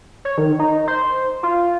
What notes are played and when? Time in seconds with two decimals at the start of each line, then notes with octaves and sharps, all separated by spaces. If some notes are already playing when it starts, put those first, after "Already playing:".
0.25 C#5
0.38 D#3
0.59 D#4
0.88 C5
1.43 F4